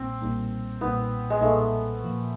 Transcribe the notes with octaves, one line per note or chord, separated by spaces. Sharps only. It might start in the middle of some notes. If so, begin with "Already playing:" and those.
Already playing: B1 A#2 G3 A#3 C4
B1 A#2 G3 A#3 D#4
B1 A#2 G3 A#3 B3 D#4
G#3
B1 A#2 G3 A3 A#3 D#4
A#2 F3 A#3